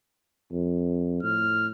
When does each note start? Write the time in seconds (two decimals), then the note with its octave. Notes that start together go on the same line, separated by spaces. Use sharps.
0.52 F2
1.23 A2 F6